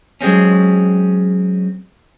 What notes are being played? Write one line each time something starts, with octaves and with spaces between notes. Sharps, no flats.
F#3 G#3 C4 C#4